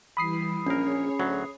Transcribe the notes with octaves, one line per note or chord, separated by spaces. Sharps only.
E3 G3 E4 B5 D#6 C7
A#1 C#4 G#4 A#4 C#5
D2 F#3